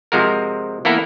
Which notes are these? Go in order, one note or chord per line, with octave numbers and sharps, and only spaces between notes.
C3 F3 G#3 F#4 A#4
E3 A#3 B3 E4 A4 A#4